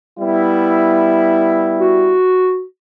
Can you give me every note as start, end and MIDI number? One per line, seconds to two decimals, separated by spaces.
0.20 2.17 55
0.20 2.17 59
0.20 2.17 64
1.80 2.63 66